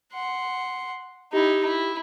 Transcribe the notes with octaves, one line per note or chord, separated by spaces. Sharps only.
F#5 C6
D#4 E4 G4
E4